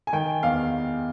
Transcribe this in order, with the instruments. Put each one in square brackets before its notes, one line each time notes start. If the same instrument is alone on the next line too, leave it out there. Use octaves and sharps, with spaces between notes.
[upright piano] G#5
D#3 G5
E2 F5